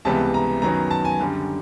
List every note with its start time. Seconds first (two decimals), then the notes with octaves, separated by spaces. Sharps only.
0.05 C#2 C3 E3 G3 B3 A5
0.34 A#5
0.62 F#2 D#3 F#3 B3 A#5
0.91 A5
1.05 G#5
1.20 F#2 D3 G3